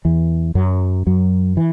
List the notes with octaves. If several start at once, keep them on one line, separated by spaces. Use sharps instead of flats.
E2 E3
F#2 F#3
F#2 F#3
E3